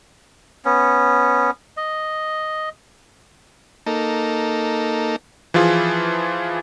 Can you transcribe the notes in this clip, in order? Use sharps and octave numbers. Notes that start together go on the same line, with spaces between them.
B3 C#4
D#5
A#3 D#4 A4
E3 F3 E4 F4 G#4